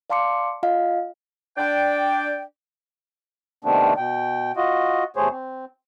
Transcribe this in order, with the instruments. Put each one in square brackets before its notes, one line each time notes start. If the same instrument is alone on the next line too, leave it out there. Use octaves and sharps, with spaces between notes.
[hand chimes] D5 F5 A5 C6 D6 C#7
F4 D#5 F5
[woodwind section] D4 D5 G5
[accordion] C3 D#3 A3 B3 C4 D4
B2 G5
F4 F#4 D#5
E2 C3 A3 G#4 C5 C#5
C4